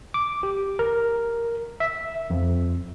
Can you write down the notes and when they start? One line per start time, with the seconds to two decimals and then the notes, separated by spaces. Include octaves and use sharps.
0.14 D6
0.43 G4
0.79 A#4
1.80 E5
2.30 F2